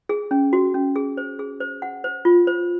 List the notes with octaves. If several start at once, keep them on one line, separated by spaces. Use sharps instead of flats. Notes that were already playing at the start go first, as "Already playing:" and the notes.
G#4
C#4
F#4
C#4
G#4
C5
G#4
C5
F#5
C5
F4
C5